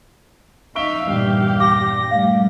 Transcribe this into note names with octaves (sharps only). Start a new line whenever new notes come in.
D#4 E5 F5 C#6 D7 G7
E2 G2 A#2 G4 F5
D6 A#6
G3 A3 F5